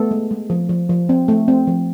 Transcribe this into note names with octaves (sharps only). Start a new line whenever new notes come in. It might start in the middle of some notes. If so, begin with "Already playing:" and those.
Already playing: A3 B3 A4
G#3
G#3
F3
F3
F3
C4
A3
C4
F3